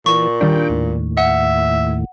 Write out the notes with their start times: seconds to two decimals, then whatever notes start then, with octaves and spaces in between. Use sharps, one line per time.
0.06 A#2 E3 C#6
0.41 D#3 G3 D4 G5
0.70 D#2 A2
1.17 E5 F#5